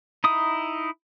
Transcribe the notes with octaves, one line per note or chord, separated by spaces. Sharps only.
D#4 E4 D#6